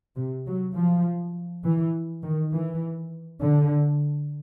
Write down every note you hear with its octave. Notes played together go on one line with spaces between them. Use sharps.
C3
F#3
F3
E3
D#3
E3
D3